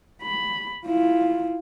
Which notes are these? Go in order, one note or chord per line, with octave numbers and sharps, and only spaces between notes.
B5
E4 F4